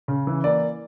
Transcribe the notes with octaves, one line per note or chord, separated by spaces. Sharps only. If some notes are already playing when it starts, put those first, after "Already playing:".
C#3
E3
A#3 D5